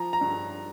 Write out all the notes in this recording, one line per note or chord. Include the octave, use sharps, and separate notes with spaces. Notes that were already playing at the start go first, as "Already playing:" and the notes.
Already playing: F3 A#5
A#5
G2